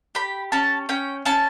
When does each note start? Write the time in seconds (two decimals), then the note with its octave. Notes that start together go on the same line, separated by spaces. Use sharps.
0.15 G4 B5
0.52 C#4 A5
0.89 C#4 G5
1.25 C#4 A5